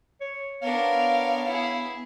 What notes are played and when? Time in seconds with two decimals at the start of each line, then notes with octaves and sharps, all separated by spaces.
0.21 C#5
0.62 B3 D4 A#4 C#5 F5
1.47 E4 G#4